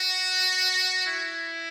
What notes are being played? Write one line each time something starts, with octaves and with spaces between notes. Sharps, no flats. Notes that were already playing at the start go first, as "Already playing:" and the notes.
Already playing: F#4
E4